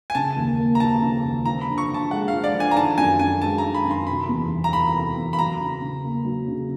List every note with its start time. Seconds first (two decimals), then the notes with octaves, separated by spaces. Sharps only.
0.10 G#5
0.15 C#3 A5
0.37 D#2
0.59 A#3
0.75 A#5
0.80 F3 A5
1.01 C#3
1.24 D#2
1.45 F3 A#5
1.61 B5
1.68 D3
1.78 C#6
1.89 D3
1.94 A5
2.11 G#3 F#5
2.28 F5
2.33 F3
2.44 D5
2.54 D3
2.60 G#5
2.71 A#5
2.76 D#3 A5
2.98 F#2 G#5
3.19 F#2 G#5
3.42 G#3 A5
3.58 A#5
3.64 D#3
3.74 B5
3.85 F#2
3.91 C6
4.07 C3 B5
4.29 E2
4.50 G3
4.64 A#5
4.73 E3 B5
4.95 C3
5.17 E2
5.33 B5
5.39 F#3 A#5
5.60 C#3
5.81 C#3
6.04 A#3
6.25 F#3
6.48 C#3